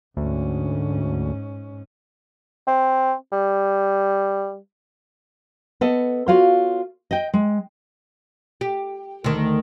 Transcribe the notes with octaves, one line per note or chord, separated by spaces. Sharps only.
D2 G#2 C#4
C4
G3
B3 A4 D#5
F4 F#4 C#5 F5
D#5 G5
G#3
G4
D2 D#3